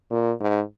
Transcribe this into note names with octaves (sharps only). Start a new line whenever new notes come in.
A#2
G#2